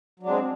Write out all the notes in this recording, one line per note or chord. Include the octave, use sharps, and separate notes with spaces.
F#3 G#3 C4 D4